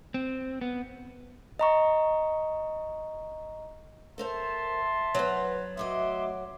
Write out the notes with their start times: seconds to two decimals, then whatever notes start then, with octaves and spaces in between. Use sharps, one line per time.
0.14 C4
0.61 B3
1.59 D#5 A#5 C#6
4.18 A4 A#4 C5 E5 A5 C6
5.15 F#3 B3 C5
5.77 A3 F#4 D#5 E5 C6 D6